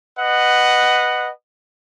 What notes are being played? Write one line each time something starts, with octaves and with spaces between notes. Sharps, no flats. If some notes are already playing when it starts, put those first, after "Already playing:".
B4 D#5 F#5